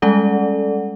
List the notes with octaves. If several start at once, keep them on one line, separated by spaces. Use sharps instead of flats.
G3 G#3 C#4 A4 D5 F#5